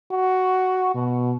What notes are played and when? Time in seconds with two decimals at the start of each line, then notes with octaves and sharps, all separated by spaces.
0.11 F#4
0.94 B2